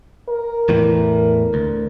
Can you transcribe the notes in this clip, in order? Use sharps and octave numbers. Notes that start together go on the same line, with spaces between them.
A#4
E2 A2 E3
D2